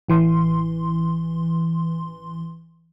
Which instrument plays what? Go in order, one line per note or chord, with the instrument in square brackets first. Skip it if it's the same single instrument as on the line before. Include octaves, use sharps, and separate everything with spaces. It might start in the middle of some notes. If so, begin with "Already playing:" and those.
[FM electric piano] A1 E3 C6